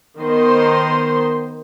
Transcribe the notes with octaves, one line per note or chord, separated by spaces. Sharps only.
D#3 B3 C5 D#5 C6